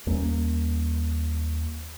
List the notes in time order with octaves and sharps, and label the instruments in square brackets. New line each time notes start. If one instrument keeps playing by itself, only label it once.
[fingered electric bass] D#2 G3 A#3 C#4